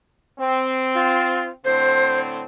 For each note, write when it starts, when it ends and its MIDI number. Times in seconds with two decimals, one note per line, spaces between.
0.39 1.50 60
0.94 1.48 65
1.65 2.45 45
1.65 2.45 50
1.65 2.45 60
1.65 2.18 72